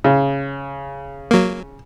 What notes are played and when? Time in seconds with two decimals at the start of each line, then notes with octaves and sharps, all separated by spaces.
0.04 C#3
1.31 F#3 A#3